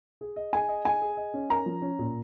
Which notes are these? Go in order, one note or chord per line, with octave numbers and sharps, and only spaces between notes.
G#4
D#5
G#4 G#5
D#5
G#4 G#5
G#4
D#5
C#4
A#4 A#5
F3
C#4
A#2